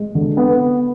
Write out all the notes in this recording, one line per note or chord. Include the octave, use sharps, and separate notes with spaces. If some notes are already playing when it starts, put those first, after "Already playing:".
Already playing: G#3
D3
B3